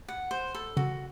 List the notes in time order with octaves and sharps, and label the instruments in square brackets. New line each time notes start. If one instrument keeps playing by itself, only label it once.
[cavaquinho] F#5
C5
A4
[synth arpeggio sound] C#3 [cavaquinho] F#4